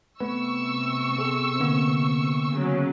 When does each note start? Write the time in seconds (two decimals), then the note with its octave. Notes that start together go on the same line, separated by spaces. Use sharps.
0.20 C3 A3 B3 B4 C#6 E6
1.16 B3 G#4 A4
1.60 D3 A#3 B3
2.50 C#3 F#3